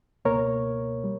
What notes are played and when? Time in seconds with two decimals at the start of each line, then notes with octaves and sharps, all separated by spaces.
0.25 C#2 B2 A#3 A#4 C#5
1.04 G3